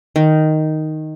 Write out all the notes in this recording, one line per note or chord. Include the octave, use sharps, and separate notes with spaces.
D#3